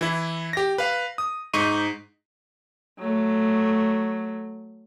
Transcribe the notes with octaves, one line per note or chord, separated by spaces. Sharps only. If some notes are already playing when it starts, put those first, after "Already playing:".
E3 E4
G4 A#6
B4 F5
D#6
G#2 D#4 C#6 D#7
F#3 A3